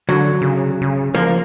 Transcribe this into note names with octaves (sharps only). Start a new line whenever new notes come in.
D3 F#3
C#3
C#3
F3 A#3